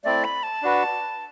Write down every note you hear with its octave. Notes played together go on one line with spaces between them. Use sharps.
A3 C4 E4 D5
B5
A5
D4 F#4 B4